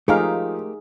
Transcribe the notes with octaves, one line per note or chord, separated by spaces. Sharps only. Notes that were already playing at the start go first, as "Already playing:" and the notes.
F3 A3 D#4 G4 G#4 A#4 F5